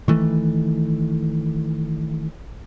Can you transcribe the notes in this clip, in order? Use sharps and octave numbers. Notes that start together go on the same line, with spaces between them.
D#3 E3 A3